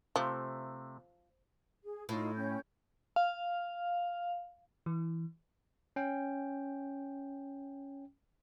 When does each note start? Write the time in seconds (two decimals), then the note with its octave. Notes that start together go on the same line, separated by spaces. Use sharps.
0.16 C3 F3 A3
1.84 G#4
2.09 A2 D#4 F4
2.35 C#4 G5 G6
3.16 F5
4.86 E3
5.96 C#4 G5